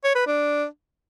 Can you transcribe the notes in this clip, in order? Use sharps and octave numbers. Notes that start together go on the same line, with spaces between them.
C#5
B4
D4